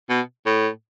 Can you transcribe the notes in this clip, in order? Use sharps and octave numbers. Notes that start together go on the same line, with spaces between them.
B2
A2